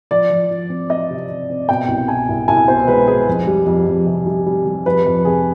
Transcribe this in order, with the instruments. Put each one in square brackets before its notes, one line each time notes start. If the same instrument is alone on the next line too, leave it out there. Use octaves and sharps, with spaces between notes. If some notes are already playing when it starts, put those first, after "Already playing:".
[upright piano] F3 D5
F3
F3
C4
C4 D#5
C3
C3
C4
B2 G5
C2
B2 G#5
C2
C2 G#5
B2 C5
G#3 B4
G#3 G#4
F2
G3
F2
F2
C3
G3
G3
G3
F2 B4
F2
C3 G#4